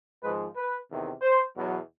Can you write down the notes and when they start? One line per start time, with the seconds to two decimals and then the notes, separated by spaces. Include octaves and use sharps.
0.23 G#1 G#2 F3 G#3 B4
0.56 B4
0.89 E2 C3 D#3
1.22 C5
1.55 E2 B2 F#3